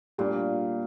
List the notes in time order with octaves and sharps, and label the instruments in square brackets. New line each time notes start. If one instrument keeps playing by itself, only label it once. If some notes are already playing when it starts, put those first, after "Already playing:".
[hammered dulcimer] A#2 [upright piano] G3 D4 F4